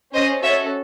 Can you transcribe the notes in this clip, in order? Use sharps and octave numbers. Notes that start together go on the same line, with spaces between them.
C#4 G#4 C5 D#5
C#4 F#4 A4 C#5 E5